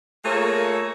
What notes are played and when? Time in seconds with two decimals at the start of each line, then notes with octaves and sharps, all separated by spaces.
0.24 A3 A#3 F4 G#4 C#5